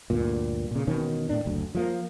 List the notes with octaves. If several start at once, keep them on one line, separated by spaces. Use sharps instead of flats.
D2 G2 A#2
A#2 C#3
E1 B2 D#3 C#4
A2 D4
F#1 D2
F3 A3 A#3